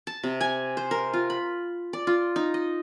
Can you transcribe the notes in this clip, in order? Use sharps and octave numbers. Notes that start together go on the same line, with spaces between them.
A5
C3
G#5
C5
A#4
F4
B5
D5
F4
D#4
D#5